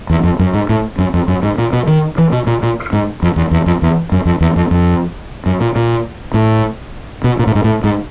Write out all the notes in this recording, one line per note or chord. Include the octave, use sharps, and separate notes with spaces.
E2
F2
F#2
G#2
A2
F#2
F2
F#2
G#2
A#2
B2
D#3
E3
B2
A#2
A#2
G#2
F2
E2
E2
F2
E2
F#2
F2
E2
F2
F2
F#2
A#2
A#2
A2
B2
A#2
A2
G#2
A2
G#2